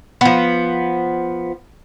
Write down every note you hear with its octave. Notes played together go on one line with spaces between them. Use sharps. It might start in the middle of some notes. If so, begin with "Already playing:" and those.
F3 B3